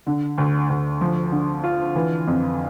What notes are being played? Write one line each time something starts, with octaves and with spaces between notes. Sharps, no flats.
D3
D2
D2
F3
D3
F4
E3
F2